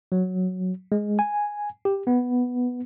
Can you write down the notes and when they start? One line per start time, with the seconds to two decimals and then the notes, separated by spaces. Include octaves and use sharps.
0.12 F#3
0.92 G#3
1.19 G#5
1.85 G4
2.07 B3